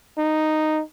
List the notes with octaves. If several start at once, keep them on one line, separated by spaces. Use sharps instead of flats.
D#4